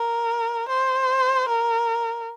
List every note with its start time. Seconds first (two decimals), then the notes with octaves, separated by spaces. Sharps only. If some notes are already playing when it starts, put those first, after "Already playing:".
Already playing: A#4
0.69 C5
1.49 A#4